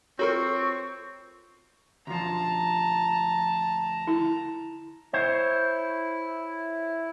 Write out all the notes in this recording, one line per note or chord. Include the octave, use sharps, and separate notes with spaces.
C4 F4 F#4 A4 A#4 C#5 C#6
D2 F3 A5 A#5
E4
E4 C5 C#5